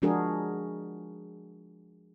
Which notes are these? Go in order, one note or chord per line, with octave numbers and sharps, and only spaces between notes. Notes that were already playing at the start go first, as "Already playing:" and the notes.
F3 G#3 D4 F#4 G#4 A#4